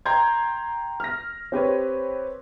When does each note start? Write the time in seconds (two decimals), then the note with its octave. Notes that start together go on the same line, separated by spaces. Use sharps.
0.06 G5 A#5 C6 G6 G#6
1.00 F6 A#6
1.52 C4 G4 B4 C#5